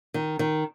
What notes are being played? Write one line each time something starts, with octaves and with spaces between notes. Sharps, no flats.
D#3
D#3